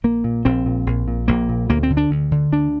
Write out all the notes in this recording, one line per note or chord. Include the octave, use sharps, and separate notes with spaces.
A#1 A#3
A#2
A#1 C4
A#2
A#1
A#2
A#1 A#3
A#2
D2 A#3
C4
D3
D4
D2
D3
D2 D4